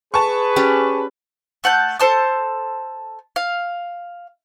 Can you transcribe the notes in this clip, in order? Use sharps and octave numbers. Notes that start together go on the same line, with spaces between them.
G#4 B4 A5 C#6
C#4 G4 D5
A3 F#5 A5 G6
A4 C5 A5 D#6
F5